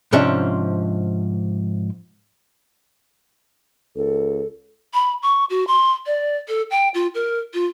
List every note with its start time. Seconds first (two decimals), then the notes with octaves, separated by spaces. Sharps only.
0.13 G#2 C3 F3 C#4 D4 E5
3.96 C#2 A4
4.94 B5
5.23 C#6
5.50 F#4
5.67 C6
6.06 D5
6.48 A4
6.71 G5
6.94 F4
7.15 A#4
7.54 F4